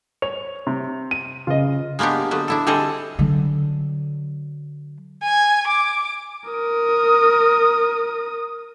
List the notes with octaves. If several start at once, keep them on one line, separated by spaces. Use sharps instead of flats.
C#5 F7
C3
D#7
C#3 F4 D#5
G#3 A#3 B3 D4 G4
D3 F#3 B3
D4 E4 A4
D3 G3 C4 G#4 A4 D#5
D3 F#3
G#5
D6
A#4 D#6